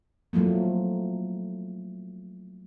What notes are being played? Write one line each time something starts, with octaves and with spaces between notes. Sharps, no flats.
F3 F#3 A3 A#3